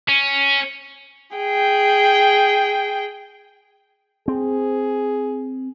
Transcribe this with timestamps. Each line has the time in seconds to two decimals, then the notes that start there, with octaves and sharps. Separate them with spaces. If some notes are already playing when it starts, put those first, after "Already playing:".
0.08 C#4
1.36 G#4 G5
4.28 C4 G#4